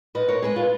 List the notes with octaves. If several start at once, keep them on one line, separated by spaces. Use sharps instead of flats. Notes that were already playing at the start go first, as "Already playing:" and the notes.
A#2 B4 D#5
A#4 C#5
G#3 B3 G#4 B4
F4